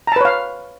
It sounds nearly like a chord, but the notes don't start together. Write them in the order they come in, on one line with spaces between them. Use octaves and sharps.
A#5 A5 B4 C#5 F5